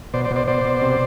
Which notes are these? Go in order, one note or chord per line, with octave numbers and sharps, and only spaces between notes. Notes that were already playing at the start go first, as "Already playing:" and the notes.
B2 C5 D5
C5 D5
B2
C5 D5
B2 C5 D5
B2
C3